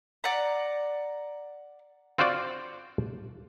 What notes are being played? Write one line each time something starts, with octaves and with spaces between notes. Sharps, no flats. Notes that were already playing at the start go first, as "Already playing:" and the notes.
D5 F#5 A#5
C4 F4 F#4 C5 D5 F#5